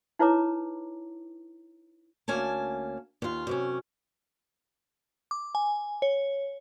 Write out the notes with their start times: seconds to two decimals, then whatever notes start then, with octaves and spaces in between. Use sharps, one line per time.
0.19 D#4 E4 B4 C#5 A#5 D6
2.28 D2 A#3 C#4 G#5 A5
3.22 D#2 F4
3.47 F#2 C3 C#4
5.31 D6
5.55 G#5
6.02 C#5